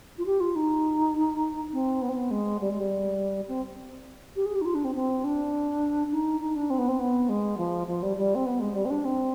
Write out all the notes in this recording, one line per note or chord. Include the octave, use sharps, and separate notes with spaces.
F4
G4
F4
D#4
C4
B3
C4
B3
G#3
G3
G#3
G3
C4
G4
G#4
G4
D#4
F4
D4
C4
C4
D4
D#4
D#4
D4
C4
B3
C4
B3
G#3
F3
F3
G3
G3
C4
B3
G#3
G3
C4
D4
C4